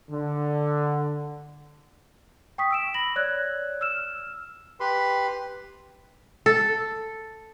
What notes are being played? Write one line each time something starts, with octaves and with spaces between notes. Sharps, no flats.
D3
G5 C#6 D#6 B6
E6 D7 E7
B5 A#6 F#7
C#5 D5 E6 F#6 G#6
E6 F6 E7
G4 B4 B5 C6
A4